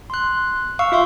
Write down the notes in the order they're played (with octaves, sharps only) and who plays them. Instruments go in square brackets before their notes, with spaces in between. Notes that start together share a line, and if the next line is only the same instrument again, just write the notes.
[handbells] C6 F#6
[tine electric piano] F5 [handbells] C#6 E6
[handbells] F4 E5 C6